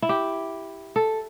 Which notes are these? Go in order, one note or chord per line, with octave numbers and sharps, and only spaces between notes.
E4
G4
A4